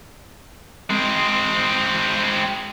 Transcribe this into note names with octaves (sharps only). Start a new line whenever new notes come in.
G#3 C4